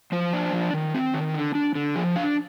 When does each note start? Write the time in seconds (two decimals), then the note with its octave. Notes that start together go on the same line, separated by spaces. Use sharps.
0.12 F3 C5
0.33 D4
0.53 F3
0.74 D#3
0.94 C4
1.14 D#3
1.34 D3
1.55 D4
1.75 D3
1.96 F3 G#4
2.16 D4 F5